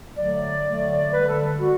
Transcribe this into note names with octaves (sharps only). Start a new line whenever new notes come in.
D3 F#3 A3 D5
D3 F#3 A3
D3 G3 B4
A4
D3 G3 F#4